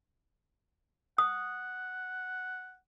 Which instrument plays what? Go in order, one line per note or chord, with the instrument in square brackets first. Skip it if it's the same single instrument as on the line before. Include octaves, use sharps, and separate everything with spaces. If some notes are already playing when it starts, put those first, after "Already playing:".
[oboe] F#5 [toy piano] D#6